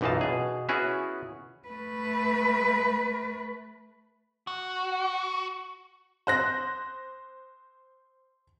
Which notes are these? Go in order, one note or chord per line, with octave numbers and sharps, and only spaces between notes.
B1 F#2 E3 D#4 F4 A5
B2 G#4
B3 C#4 E4 F#4 G#4
A3 B4
F#4
C5 F#6 A#6